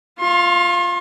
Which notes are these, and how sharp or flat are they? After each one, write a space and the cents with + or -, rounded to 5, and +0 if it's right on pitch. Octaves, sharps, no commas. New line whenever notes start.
F4 +0 C6 +40